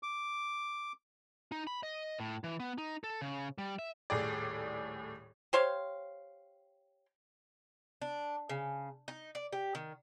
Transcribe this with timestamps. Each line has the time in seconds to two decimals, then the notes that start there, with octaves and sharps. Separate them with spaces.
0.03 D6
1.52 D#4
1.67 B5
1.83 D#5
2.20 A2
2.44 E3
2.60 B3
2.78 D#4
3.04 A4
3.21 C#3
3.58 G3
3.79 E5
4.10 D#1 A2 G#4 D5
5.53 G4 C5 C#5 F5
8.02 D4
8.49 C#3
9.08 D#4
9.35 D5
9.53 G4
9.75 D#3